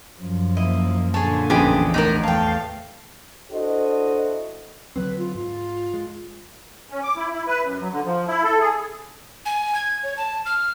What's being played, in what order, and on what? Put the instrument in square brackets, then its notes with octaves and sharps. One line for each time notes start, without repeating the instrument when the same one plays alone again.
[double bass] F#2 F3
[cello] A#3 [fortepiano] E4 [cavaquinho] D#5
[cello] A#2 D3 [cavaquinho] G#4 C#5 [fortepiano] A5
[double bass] A1 E2 [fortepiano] C#3 F3 B3 [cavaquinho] G4 G#4 D#5
[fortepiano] D2 A2 [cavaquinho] D#4 E4 A#4
[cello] E2 F5 [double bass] A3 [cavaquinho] G5 A5
[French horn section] D4 E4 F#4 A4 C5 D#5
[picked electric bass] D3 F#3 C4 [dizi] B4
[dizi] F4
[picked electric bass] G#2 [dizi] F4
[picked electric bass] G#3
[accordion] C#4
D6
E4
E4
B4
F#2
F#3
D3
F3
E4
A4
G#4
[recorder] G#5
G#6
C#5
A5
F6